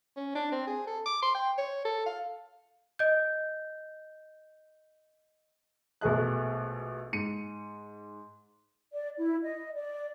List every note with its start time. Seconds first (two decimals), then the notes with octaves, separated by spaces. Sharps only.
0.16 C#4
0.35 D4
0.52 C4
0.67 G#4
0.87 A4
1.06 D6
1.22 C6
1.34 G5
1.58 C#5
1.85 A4
2.06 F5
2.99 D#5 G6
6.01 A#1 B2 A3 G#4 D#5 F#6
7.13 G#2 C#7 D#7
8.92 D5
9.17 E4
9.43 D#5
9.74 D5